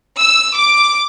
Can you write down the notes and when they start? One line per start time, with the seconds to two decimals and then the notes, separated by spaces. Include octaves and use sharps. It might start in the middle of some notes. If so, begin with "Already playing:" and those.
0.19 E6
0.57 D6